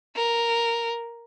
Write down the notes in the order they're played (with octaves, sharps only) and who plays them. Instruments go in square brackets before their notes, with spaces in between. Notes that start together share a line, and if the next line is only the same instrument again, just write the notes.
[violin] A#4